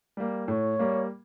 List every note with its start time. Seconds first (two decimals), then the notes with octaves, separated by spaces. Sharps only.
0.17 G3 A#3
0.48 A2 C#5
0.79 G3 A#3